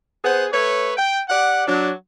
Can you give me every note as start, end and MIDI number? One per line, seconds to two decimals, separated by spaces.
0.24 0.47 59
0.24 0.47 68
0.24 0.47 72
0.24 0.47 78
0.53 0.92 57
0.53 0.92 71
0.53 0.92 73
0.97 1.21 79
1.29 1.64 67
1.29 1.64 74
1.29 1.64 78
1.68 1.91 54
1.68 1.91 62